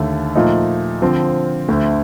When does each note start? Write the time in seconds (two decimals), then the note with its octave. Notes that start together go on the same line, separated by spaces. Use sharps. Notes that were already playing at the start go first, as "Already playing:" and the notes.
Already playing: D#2 D3 A3
0.35 A#2 F3 A3 D#4
1.02 D3 F3 C4
1.68 D2 D3 A3